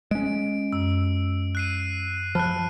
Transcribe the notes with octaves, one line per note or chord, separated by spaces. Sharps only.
G#3 C#4 D7
F#2 E6
F#6 C7 D#7
F3 A5 B5 F6 F#6